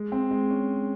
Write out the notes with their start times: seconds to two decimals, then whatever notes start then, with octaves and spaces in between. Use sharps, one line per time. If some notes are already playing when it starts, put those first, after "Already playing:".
Already playing: G#3
0.12 C4
0.31 G#3
0.50 C#4